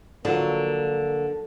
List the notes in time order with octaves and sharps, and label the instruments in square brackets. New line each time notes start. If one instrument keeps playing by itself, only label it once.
[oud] D3 [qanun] F3 F#3 [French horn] A#3